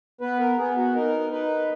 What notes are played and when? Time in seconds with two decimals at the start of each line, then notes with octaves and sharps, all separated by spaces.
0.21 B3 B4
0.39 A#4
0.58 B3 G#4
0.77 F#4
0.94 D#4 A#4
1.31 D#4 B4